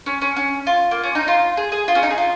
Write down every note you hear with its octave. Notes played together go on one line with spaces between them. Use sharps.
C#4
C#4
C#4
F4
A#3
C#4
D#4
F4
G#4
G#4
F4
C#4
D#4
G#4
F4